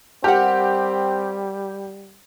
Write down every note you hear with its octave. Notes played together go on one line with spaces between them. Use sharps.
G3 C4 G4 A#4 F#5